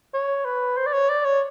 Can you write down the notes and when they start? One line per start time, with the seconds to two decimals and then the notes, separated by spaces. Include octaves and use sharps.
0.14 C#5
0.45 B4
0.77 C5
0.86 D5
0.93 C#5
1.09 D5
1.25 C#5